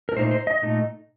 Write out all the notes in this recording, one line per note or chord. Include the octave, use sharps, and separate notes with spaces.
A#4
A#2 A3 D#4 C5
C5
D#5
A#2 A3 D#4